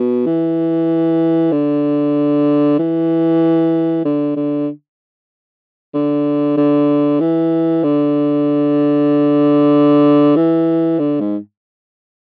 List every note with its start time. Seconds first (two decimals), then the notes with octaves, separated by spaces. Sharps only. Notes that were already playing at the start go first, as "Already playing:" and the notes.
Already playing: B2
0.26 E3
1.52 D3
2.79 E3
4.05 D3
4.36 D3
5.94 D3
6.57 D3
7.20 E3
7.84 D3
10.36 E3
10.99 D3
11.20 G#2